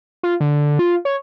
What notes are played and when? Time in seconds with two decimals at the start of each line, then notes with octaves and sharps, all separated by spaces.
0.23 F4
0.40 D3
0.79 F4
1.05 C#5